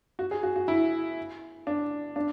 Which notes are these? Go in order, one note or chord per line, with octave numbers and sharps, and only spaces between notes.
F#4
G#4
F#4
F#4
E4
D4
D4